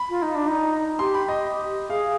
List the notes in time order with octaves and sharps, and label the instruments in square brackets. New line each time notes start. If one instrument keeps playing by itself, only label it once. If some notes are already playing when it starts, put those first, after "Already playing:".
Already playing: [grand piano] B5
[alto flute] F4
D#4
D4
D#4
[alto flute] G4 [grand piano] C6
[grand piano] B5
D#5
[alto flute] G#4 [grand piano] F5